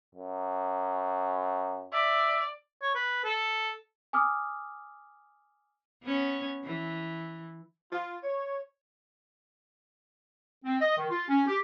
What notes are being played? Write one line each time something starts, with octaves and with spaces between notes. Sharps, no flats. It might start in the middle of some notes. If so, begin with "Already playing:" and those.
F#2
D5 E5
C#5
B4
A4
G#5 D6 D#6 F6
B3 C#4 C#5
E3
F4
C#5
C4
D#5
D#3
F4
C#4
G4